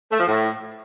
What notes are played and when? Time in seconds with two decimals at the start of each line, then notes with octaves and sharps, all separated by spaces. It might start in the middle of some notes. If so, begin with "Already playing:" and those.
0.11 A3
0.18 F3
0.26 A2